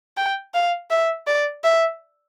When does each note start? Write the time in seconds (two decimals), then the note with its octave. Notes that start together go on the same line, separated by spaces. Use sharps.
0.17 G5
0.54 F5
0.91 E5
1.27 D5
1.64 E5